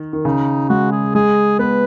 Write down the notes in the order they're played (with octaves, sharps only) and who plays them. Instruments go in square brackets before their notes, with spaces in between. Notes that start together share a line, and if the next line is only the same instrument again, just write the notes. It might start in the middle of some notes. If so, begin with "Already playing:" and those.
Already playing: [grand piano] D#3
D#3
[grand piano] C#3 [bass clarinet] D#4
[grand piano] G#3 [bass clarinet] F#4
[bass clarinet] G#4
[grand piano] G#3 [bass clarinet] G#4
[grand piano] B3 [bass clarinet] B4